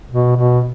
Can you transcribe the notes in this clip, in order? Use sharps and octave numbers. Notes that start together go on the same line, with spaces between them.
B2
B2